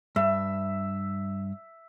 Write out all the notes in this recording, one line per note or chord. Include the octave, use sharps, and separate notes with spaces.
G2 E5